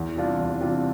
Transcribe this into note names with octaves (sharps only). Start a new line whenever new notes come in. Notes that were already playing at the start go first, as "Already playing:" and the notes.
Already playing: E2
C3 G3 D4 F4
E2
C3 G3 D4 F4